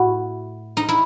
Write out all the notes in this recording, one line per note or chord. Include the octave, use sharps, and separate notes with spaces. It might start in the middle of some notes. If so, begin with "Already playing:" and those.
Already playing: A2 E4 F#4
D#4
E4